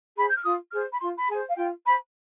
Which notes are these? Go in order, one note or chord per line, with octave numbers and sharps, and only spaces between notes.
G#4 C5 B5
G6
F6
F4 D#6
G#4 C5 F6
B5
F4 C6
B5
G#4 C5 G#5
F5
F4 G5
C5 B5